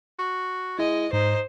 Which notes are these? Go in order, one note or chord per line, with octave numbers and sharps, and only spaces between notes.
F#4
G#3 E4 D#5
G#2 D#4 C5